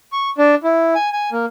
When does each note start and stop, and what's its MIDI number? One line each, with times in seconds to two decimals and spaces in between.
0.13 0.30 85
0.38 0.55 62
0.64 0.94 64
0.95 1.09 80
1.12 1.30 80
1.32 1.45 58